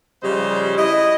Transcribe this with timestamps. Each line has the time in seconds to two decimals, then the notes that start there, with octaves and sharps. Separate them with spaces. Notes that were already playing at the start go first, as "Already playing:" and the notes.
0.23 C#3 F3 G3 C5 D#5
0.76 E4 D#5